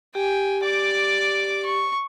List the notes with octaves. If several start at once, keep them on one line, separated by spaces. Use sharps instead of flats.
G4 G5 G#5
D5 D6
C#6